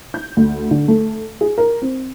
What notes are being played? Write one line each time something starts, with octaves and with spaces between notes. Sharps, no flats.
G6
D2
D3
A3
G#4
A#4
C4